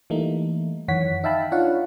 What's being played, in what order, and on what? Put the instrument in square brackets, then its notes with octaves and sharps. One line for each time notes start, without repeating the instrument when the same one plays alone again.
[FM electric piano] E3 G3 A3 A#3 D#4
F#2 D#3 E3 C#5 F#5 B6
D#4 E5 F5 G5 A5 B5
D4 D#4 F4 C#5 F5 F#5